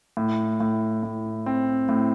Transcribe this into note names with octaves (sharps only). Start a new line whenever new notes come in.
A2
A2
A2
C4
A2